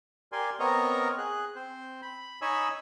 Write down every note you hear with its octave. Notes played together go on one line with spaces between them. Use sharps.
G4 A#4 D5 G#5 C6
B3 C4 A#4 C#5 D#5 A#5
G#4 F#6
C4 C5
B5
D#4 C#5 D#5 G#5 B5 E6